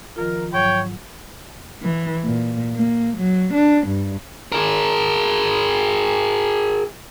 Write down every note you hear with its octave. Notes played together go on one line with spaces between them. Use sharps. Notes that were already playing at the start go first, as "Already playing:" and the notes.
D#3 F3 F4 A#4
G#2 F#3 C#5 G5
E3
A#2
A#3
F#3
D4
G2
G#4 A#4